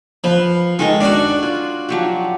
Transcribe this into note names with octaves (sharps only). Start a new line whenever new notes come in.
F3 B4 B5
D#3 G#3 A4 A#4
C#4 D4 F#4 D5
F4
F3 F#3 G4